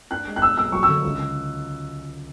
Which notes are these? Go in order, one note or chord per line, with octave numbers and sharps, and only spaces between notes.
D4 F#6
G#3
F#6
B1 E6
B1 E6
F#3 C#6
E6
D3
C#2